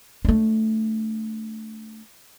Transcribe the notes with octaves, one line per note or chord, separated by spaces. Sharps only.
A3 D4